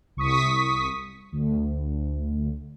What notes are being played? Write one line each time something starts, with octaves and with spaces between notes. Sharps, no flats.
C2 C#6 D#6 B6
D2